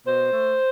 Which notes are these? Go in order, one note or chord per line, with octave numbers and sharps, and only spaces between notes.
B2 C5
A3